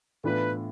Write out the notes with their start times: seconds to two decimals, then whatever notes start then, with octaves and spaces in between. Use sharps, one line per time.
0.24 A2 E3 B3 D4 F4 B4